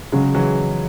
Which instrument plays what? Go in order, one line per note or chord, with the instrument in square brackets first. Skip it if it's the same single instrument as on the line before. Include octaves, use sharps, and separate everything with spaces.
[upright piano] C#3 [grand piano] F#3 G#3
[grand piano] E3 F#3